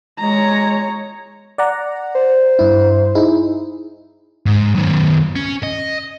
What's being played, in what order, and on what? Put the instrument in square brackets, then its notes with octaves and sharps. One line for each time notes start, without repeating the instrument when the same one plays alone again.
[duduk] G#3 [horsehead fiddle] C#5 A#5
[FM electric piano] D5 F#5 A#5
[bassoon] C5
[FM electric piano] G2 E4
D#4 E4 G#4
[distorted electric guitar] G#2
F#2 D#3
C#4
D#5